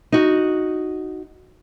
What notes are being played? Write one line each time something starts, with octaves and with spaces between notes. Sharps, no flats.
D#4 F#4